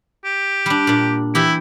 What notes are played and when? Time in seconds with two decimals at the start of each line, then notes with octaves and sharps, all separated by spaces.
0.25 G4
0.66 G3 D4
0.87 A#2 D4
1.35 E3 E4 G4